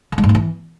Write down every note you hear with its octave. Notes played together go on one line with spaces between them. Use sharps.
D3
G#3
G#2
A3
E3